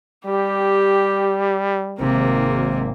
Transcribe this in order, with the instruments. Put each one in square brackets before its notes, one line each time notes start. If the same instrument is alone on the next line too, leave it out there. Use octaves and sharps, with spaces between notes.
[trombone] G3 [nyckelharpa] G4
[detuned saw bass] G#1 [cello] C3 [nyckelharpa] A#3